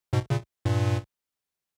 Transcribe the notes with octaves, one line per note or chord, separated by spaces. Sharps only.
G#2 B2
A#2 C#3
G2 A#2